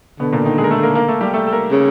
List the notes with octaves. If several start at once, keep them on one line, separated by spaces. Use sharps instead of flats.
B2 D3 B3
A#2 A#3
D#3 D#4
G#3 G#4
A#4
A3 A4
A#3 A#4
A#3 A#4
A3 A4
G3 G4
A3 A4
A4
A#3 A#4
C#3